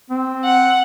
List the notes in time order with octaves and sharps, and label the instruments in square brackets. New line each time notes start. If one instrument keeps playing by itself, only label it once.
[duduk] C4
[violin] F#5